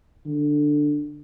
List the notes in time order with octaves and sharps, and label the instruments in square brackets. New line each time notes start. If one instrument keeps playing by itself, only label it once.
[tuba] D3